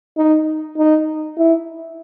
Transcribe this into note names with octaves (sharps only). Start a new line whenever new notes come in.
D#4
D#4
E4